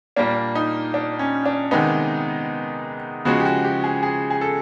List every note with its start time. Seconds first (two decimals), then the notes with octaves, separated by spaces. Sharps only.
0.16 A#2 G3 A#3 D4
0.55 D#4
0.94 D4
1.19 C#4
1.46 D4
1.71 C3 D#3 G#3 B3 D#4
3.25 C#3 F3 G#3 F#4
3.40 G4
3.45 F#4
3.65 G4
3.84 G#4
4.03 G#4
4.30 G#4
4.41 A4